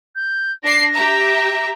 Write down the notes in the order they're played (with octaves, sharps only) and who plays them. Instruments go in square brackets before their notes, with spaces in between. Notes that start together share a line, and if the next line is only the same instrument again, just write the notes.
[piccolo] G6
[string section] D4 C7 [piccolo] A#6
[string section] G4 E5 A#5